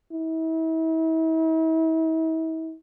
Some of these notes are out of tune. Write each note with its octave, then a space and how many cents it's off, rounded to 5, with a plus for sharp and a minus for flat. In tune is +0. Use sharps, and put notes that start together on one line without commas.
E4 -40